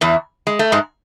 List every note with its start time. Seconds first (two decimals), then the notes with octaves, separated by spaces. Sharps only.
0.01 E2 E3
0.47 G#3
0.59 A3
0.72 G#2 G#3